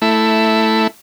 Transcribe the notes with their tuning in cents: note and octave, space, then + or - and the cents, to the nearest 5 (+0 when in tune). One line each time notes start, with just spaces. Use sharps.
A3 +5 E4 +0